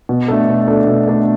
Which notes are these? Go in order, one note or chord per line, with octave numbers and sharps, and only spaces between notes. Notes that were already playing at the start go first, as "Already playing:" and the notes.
B2
A3 D4 A4
B2
A3 D4 A4
B2
A3 D4 A4